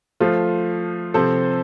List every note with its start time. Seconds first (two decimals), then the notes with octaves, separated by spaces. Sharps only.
0.20 F3 A3 F4
1.14 C3 F3 C4 A4 C5